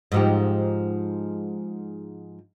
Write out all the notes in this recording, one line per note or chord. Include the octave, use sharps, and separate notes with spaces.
G#2 F3 G4